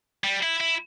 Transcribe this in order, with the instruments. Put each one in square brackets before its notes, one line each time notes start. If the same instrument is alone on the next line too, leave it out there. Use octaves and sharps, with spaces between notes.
[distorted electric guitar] G3
E4
E4